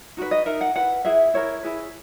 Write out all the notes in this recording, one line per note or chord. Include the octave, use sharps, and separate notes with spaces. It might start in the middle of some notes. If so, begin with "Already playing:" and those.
D#4 F#4 B4
D#5
D#4 A#4 E5
F#5
E4 B4 F#5
E4 G#4 B4 E5
E4 A#4 C#5
E4 G#4 B4